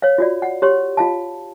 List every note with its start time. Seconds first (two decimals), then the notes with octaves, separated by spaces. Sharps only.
0.02 C#5 F5
0.18 F4 F#4 D5
0.42 F#5
0.62 G4 C#5 C6
0.97 F4 F5 A5